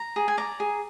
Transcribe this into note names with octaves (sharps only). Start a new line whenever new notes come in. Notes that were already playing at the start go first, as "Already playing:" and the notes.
Already playing: A#5
G#4
G#5
D5 A#5
G#4